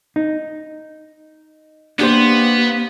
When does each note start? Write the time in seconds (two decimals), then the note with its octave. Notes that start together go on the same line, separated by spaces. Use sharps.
0.16 D#4
1.99 A#3 B3 D4 G4 C5